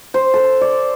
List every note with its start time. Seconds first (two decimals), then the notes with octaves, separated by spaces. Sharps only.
0.14 C5
0.34 A4
0.61 D5